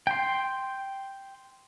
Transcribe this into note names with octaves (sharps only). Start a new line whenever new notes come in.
G5 C6